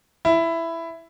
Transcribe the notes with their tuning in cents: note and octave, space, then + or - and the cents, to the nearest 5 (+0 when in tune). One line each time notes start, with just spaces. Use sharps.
E4 +10